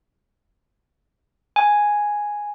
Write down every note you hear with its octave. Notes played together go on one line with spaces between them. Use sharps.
G#5